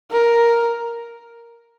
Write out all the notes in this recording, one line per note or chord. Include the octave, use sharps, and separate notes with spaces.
A#4